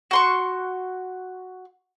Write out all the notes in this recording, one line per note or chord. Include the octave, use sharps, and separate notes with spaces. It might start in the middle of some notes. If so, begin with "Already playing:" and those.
F#4 C6 C#6